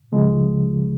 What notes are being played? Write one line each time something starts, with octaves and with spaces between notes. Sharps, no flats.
C#2 C#3 F3 G#3